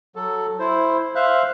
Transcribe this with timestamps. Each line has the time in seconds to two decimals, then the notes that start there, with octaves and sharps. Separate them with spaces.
0.16 F#3 A4
0.59 E4 C5
1.15 C5 E5 F5 F#6